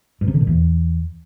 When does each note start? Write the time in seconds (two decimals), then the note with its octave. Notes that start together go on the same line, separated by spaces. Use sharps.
0.21 G2
0.28 C3
0.34 D3
0.41 A#2
0.47 E2